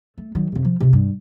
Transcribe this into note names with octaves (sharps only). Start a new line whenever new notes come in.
A3
D#3 F#3
F2 C3
F3
C3 F4
G2